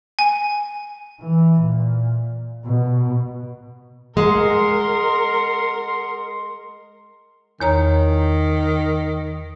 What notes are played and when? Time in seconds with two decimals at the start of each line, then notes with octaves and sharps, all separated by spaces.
0.19 G#5
1.21 E3
1.60 A#2
2.65 B2
4.17 G#3 A#4 F#5 C6
7.60 E2 D#3 C#5 A#5